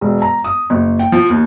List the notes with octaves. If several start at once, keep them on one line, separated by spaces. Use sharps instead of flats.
E1
A#5
D#6
F#1
G5
F3
D#2